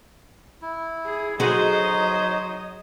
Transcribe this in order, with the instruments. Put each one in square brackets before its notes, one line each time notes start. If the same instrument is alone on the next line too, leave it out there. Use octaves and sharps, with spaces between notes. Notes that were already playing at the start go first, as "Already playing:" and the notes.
[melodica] E4
[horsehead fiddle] G#4
[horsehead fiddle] F#3 D#5 [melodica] D#4 C#5 [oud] F#4 G#4 [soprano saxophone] C5